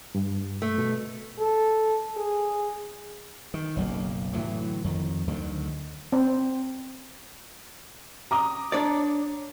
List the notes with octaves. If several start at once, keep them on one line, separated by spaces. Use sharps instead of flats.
G2
A3
B2
A4
G#4
D#3
F#1 B1 A#3
A2 D3 E3 F#3
F2 D#3
D2 D3 D#3 F#3
C4
A#5 D6 D#6
D4 C#5 D5